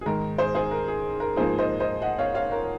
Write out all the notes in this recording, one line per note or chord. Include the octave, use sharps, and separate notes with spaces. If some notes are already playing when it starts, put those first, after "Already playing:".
G#4
G#2 D#3 G#3 A#4
G#4 C5
G#4 C5
A#4
G#4
A#4
G#2 F3 A#3 G#4 C5
C5 D#5
C5 D#5
D#5 F#5
C#5 F5
C#5 F5
A#4 C#5